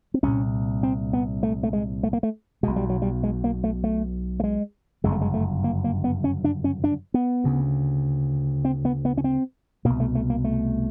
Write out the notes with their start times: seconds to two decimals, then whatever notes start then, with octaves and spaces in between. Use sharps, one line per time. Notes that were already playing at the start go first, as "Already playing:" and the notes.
0.14 C4
0.23 C2 A#2 C#4
0.83 C4
1.13 B3
1.43 A3
1.63 A3
1.73 G#3
2.03 A3
2.13 A#3
2.23 A3
2.63 B1 B2 G#3
2.76 G3
2.90 F#3
3.02 G3
3.23 G#3
3.44 A#3
3.64 A3
3.84 A3
4.40 A3
4.44 G#3
5.04 G1 F#2 C#3 G#3
5.12 A3
5.21 G#3
5.34 A3
5.64 A#3
5.84 A#3
6.04 B3
6.24 C#4
6.44 D4
6.64 C#4
6.84 D4
7.14 B3
7.44 D2 C#3
8.65 C4
8.85 B3
9.05 B3
9.18 C#4
9.24 C4
9.85 B2 A#3
9.90 C2
10.00 A3
10.15 A3
10.30 A#3
10.44 A3